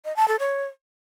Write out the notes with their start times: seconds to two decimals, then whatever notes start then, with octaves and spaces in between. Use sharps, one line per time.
0.05 D#5
0.16 A5
0.28 A4
0.39 C#5